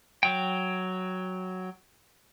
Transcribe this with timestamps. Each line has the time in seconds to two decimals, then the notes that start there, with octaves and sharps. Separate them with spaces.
0.23 F#3 G5